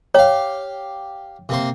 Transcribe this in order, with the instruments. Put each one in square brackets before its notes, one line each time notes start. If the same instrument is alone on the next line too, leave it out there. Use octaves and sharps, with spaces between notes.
[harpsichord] G4 F5 [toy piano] C#5
[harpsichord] C3 A#3 C5